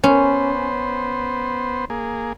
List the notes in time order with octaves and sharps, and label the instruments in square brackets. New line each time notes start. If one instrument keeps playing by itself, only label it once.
[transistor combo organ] B3 C5 [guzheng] C#4
[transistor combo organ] A#3 G#4